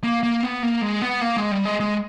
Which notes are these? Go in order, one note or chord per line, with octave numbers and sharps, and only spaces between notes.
A#3
A#3
B3
A#3
G#3
B3
A#3
G#3
G3
G#3
G#3